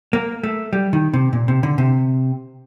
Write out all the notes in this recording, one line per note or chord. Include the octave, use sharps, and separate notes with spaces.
A#3
A3
G3
D#3
C3
A#2
C3
D3
C3